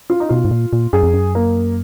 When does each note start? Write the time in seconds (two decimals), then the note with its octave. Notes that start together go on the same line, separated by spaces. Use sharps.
0.10 F4
0.20 D#4
0.29 B2 F4
0.45 G#2
0.51 A#2
0.73 A#2
0.93 F#2 G#4
1.03 F2
1.14 F#2
1.35 A#3